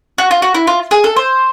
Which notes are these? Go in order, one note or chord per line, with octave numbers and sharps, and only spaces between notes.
F#4
F4
F#4
E4
F4
G#4
A4
C5